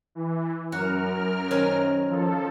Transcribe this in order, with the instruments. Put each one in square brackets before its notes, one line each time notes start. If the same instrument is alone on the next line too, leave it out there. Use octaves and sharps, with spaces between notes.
[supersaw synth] E3
[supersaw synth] F#2 A#4 F6 [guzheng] F#4
[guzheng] D#3 C#4 C5
[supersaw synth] F3 A4